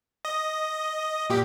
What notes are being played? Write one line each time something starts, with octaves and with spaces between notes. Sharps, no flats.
D#5
A#2 G4